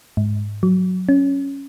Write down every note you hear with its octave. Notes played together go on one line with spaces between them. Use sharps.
G#2
F#3
C#4